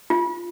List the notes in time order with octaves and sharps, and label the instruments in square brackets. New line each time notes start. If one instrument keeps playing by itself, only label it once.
[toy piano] F4